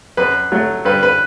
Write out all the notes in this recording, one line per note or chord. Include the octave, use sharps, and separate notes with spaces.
F#2 B4
F#3 A3
G2 B4
B4